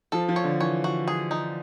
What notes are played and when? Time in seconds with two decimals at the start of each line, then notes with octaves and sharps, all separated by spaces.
0.12 F3 A4
0.29 F3
0.36 C#5
0.44 D3
0.60 E3 C#5
0.84 F#4
1.08 G#4
1.31 D#4